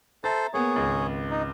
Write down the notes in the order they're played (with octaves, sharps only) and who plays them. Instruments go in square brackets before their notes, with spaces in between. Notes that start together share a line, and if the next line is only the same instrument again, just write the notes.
[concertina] A4 C5 [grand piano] E5 A#5 A6
[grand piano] A#3 B3 [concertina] G#4 C#5
[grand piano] G#1 C#2
[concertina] D#4